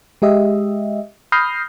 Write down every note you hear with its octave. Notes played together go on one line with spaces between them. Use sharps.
G#3 G4 D#5 E5
B5 D#6 F6 G6 A#6 C7